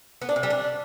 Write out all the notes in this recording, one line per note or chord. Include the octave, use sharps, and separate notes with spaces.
B3
D4
C3
G3
D4